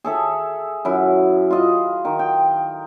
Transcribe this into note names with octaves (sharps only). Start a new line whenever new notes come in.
G#4 A4 E5
F#2 E4
F4 D#5
D#3
G5